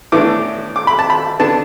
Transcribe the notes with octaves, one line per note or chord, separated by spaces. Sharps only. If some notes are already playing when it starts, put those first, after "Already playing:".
A2 E3 B3 D4 D6
D6
B5
A5
B5
D3 B3 D4 A5